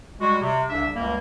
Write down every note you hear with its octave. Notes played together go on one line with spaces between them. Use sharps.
G3 G#3 F#4
C3
C2 C#3 D4 E5
C#2 F#2 G3 A#3